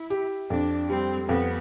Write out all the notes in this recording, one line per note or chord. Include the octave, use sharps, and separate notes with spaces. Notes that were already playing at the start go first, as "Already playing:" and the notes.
Already playing: E4
G4
F2 D4
G3 C4
F2 B3